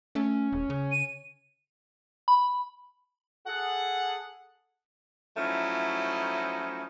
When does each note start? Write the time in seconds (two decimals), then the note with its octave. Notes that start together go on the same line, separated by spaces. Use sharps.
0.15 A3 C#4
0.52 D#1
0.70 C#3
0.92 D#7
2.28 B5
3.47 G#4 A4 F#5
5.37 F3 F#3 A3 C#4 D#4 E4